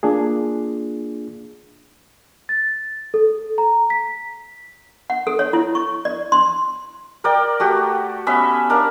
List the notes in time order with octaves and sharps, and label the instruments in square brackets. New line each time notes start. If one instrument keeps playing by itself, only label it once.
[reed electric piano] A#3 D4 F4 G#4
[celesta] A6
A4
A#5
B6
[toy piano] F#5
A4
C#5
E4
C#6
D5
C6
[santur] A#4 D5 G5
A3 F#4 G4
B3 C#4 E5 B5
D4 A#4 F5